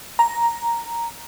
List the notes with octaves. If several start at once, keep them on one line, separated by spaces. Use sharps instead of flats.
A#5